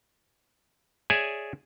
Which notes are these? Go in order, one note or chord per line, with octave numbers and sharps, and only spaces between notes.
G#4 C#5 D5 E5 G#5